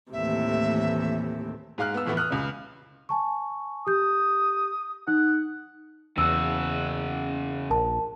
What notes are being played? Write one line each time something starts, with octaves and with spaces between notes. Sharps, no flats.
D#2 A2 C3 E3 A3 E5
G#2 G#3 F5 F6 F#6
B3 E6
F2 A2 E3 A3 B3
D#6 F6 F#6
C#2 C#3
G#5 A5 C#6
G4 D#6 G6
D#4 F#5
E2 C#3 F#4 E6
A#1 A#4 A5